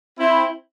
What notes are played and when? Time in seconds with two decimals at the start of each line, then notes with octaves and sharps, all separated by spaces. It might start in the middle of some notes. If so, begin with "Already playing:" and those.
0.18 C4 E4